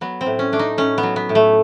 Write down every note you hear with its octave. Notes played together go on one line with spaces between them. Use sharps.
F#3 B3
C4
A2
C#4
A3 D4
D#4
A2 C#4
B3
F#3
B3
A2
A3